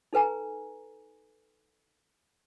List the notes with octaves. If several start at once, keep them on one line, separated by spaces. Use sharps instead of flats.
D#4 A4 B4 G#5 A#5